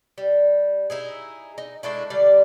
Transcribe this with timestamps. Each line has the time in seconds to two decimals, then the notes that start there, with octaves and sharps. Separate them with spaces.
0.18 G3
0.90 D#4 E4 G#4
1.58 D#4
1.83 G#3 A3 D4 E4
2.10 D3 G3 D5